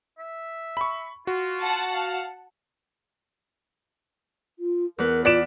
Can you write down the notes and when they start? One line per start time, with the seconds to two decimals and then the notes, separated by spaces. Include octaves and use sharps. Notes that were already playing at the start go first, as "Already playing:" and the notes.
0.19 E5
0.77 B5 C#6
1.27 F4 F#4
1.60 F#5 A5
1.94 F5
4.59 F4
4.98 E2 B3 A#4 B4
5.25 F4 B4 D5 D7 E7